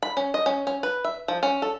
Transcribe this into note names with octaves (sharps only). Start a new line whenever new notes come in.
B5
C#4
D#5
C#4
C#4
B4
E5
F3
C#4
A4